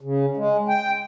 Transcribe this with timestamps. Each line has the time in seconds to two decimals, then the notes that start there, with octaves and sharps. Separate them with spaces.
0.01 C#3
0.37 G#3
0.68 G5